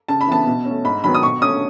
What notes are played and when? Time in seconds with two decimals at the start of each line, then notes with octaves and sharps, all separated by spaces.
0.08 C#3 A5
0.21 B5
0.27 E3 B3 A5
0.46 B2
0.65 A3 C#4
0.84 G#2 B5
1.04 D#3 F#3 B3 B5
1.15 D#6
1.23 B2 C#6
1.42 A3 C#4 D#6